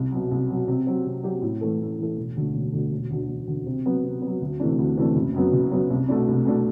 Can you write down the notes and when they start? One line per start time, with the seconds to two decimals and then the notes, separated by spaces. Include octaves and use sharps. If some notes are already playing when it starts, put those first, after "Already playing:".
Already playing: C2
0.12 B2 F#3
0.31 C2
0.50 B2 F#3
0.68 C3
0.87 F#3 C4 G4
1.06 C3
1.23 F#3 C4 G4
1.42 A2
1.61 E3 A3 E4 A4
1.80 A2
1.98 E3 A3 E4 A4
2.17 E1
2.36 D2 D3 A3
2.54 E1
2.73 D2 D3 A3
2.91 E1
3.10 D2 D3
3.28 E1
3.47 D2 D3
3.66 C3
3.85 F#3 B3
4.04 C3
4.22 B3
4.27 F#3
4.42 D2
4.60 C3 E3 A3 D4
4.79 D2
4.97 C3 E3 A3 D4
5.15 F#1
5.34 F#2 F#3 B3
5.53 F#1
5.71 F#2 F#3 B3
5.90 C2
6.08 B2 A3 D4
6.28 C2
6.45 B2 A3 D4